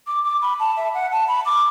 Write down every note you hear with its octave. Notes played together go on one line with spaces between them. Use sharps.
D6
D6
B5
A5
E5
F#5
A5
B5
D6